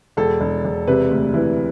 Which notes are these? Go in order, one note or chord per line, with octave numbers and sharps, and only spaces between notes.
E1 A4
E1
E1
C3 B4
D2
E3